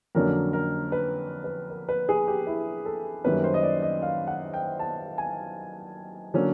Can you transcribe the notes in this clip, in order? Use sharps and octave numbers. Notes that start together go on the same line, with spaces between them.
F2 D3 F#3 A#3 C#4 A#4
A#4
B4
B4
A#4
B4
G#4
G4
E4
A4
F#2 D#3 G3 A#3 C#4 B4
C5
D#5
D5
D#5
F5
F#5
G5
A5
G#5
D3 F#3 A#3 C#4